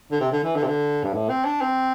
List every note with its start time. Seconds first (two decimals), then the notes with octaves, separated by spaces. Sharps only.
0.12 D3
0.20 C3
0.32 D3
0.44 E3
0.55 D3
0.62 C3
0.67 D3
1.04 G2
1.14 A2
1.29 C4
1.45 D4
1.61 C4